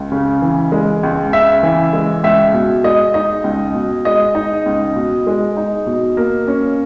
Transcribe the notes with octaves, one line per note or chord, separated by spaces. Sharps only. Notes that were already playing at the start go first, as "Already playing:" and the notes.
Already playing: C#2
C#3
E3
G#3
C#2
C#3 E5
E3
G#3
C#2 E5
B2
G#3 D#5
D#4 D#5
C#2
B2
G#3 D#5
D#4
C#2
B2
G#3
D#4
B2
A#3
C#4